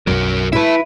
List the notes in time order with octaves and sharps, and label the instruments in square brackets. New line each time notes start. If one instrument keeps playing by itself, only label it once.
[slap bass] B1 F#2 F#3 [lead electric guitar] F#4 A#4
[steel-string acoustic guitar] E4 B4 [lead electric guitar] E5 A5